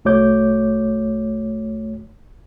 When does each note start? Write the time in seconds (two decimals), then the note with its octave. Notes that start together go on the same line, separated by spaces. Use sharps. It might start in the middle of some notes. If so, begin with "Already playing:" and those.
0.05 C2 A3 F#4 C#5 D6 G6